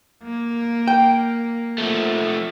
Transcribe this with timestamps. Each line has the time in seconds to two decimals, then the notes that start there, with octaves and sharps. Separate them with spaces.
0.23 A#3
0.88 G5
1.78 F3 A3